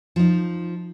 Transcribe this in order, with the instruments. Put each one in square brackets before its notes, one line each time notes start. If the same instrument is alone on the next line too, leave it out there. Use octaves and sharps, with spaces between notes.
[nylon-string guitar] F3 D#4